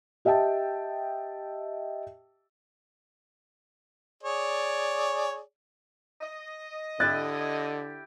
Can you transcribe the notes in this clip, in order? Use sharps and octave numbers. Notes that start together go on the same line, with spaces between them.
G4 D#5 E5 G5 A5
G#4 C#5 D5
D#5
D3 E4 G4 E5 F#6 A6